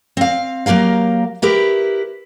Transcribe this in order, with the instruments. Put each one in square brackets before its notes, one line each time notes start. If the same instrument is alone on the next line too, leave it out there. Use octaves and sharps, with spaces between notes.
[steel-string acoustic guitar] C4 F5
F#3 A#3 G4 A#4 F5
E4 G4 A#4 B4